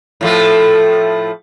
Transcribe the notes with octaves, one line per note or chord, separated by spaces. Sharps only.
A2 F3 A3